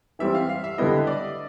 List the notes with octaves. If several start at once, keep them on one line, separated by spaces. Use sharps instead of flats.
E3 G3 C4 E5
F5
F5
E5
D3 G3 B3 E4 D#5
D5